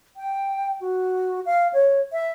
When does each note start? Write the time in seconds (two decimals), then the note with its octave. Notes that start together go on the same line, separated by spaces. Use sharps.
0.17 G5
0.81 F#4
1.45 F5
1.73 C#5
2.12 E5